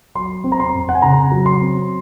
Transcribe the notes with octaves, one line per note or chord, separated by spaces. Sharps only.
F#3 C6
C4
A#5
C6
F2
F#5
G#5
C#3 A#5
F#3
C6
C4